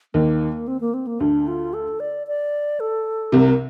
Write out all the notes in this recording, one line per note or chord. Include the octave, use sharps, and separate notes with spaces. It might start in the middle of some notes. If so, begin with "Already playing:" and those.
D#2 D#3 A#3
C4
A#3
C4
A#3
D2 D3 D4
F4
A4
D5
D5
A4
C2 C3 A#4